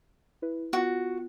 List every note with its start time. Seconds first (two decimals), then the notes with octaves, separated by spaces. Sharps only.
0.42 E4 B4
0.73 B3 F4 F#4